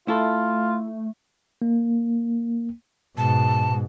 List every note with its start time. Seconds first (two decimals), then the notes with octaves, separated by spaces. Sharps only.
0.08 A3 E4 F4 A4
1.62 A#3
3.18 G#2 B2 A5